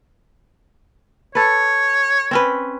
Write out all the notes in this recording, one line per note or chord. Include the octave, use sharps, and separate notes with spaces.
A4 B4 C#5
C4 C#4 B4